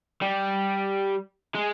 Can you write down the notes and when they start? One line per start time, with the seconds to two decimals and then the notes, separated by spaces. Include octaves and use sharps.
0.22 G3
1.55 G#3